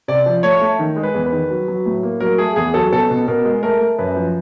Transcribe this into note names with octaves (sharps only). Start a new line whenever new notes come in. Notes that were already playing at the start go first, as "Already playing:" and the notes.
C3 D5
F3
A3 C#5
A3
D#3
G#3
B4
E2
B4
D#3
F#3
F#3
A2
A#3
F#3 A#4
A3 G#4
E2 G#4
F#3 A4
B2 A4
B2
B2 A#4
G#3
A3 A#4
A3
F#2 B4
F3